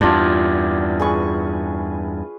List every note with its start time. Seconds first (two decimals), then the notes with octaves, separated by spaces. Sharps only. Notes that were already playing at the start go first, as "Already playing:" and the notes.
0.01 E2 G2 D4 F4
1.00 G#4 B4 C#6